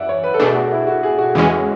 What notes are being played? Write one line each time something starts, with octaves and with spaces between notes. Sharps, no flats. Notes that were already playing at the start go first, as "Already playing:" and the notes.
Already playing: F#2 E3 D5 E5 F#5
C#5
B4
A4
B2 A3 D4 G#4
F#4
E4
F#4
G#4
F#4
E2 C#3 E3 G#3 C#4